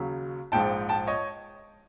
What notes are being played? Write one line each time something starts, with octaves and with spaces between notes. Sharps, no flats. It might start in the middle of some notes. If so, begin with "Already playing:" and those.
Already playing: D#2 C#3 F#3
A#1 G#2 F3 G5 A5
G5 A5
C#5 D#5